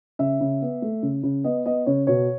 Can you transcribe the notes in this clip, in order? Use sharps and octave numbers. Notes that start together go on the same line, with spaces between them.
C#3 E5
C#3
B3
A3
C#3
C#3
B3 D#5
B3 D#5
C#3 C#5
B2 C#5